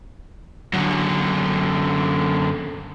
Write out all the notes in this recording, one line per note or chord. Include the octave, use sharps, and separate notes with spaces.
F#2 D3